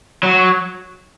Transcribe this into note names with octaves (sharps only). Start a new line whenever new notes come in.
F#3